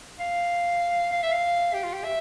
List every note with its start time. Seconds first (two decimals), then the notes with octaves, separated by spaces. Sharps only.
0.19 F5
1.12 F5
1.23 E5
1.32 F5
1.73 G4
1.84 F4
1.94 G4
2.04 E5